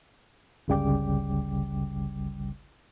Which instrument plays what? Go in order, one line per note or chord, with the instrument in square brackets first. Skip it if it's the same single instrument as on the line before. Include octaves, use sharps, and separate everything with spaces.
[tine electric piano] G1 C#2 C#3 G3 G5 D6